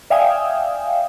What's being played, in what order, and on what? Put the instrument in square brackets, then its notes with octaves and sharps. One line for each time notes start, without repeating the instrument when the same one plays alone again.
[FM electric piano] D5 E5 F5 G5 G#5 D#6